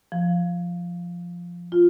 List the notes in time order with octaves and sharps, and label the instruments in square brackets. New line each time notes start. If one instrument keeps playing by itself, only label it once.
[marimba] F3
F4